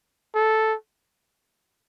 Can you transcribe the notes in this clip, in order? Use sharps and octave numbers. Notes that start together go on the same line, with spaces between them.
A4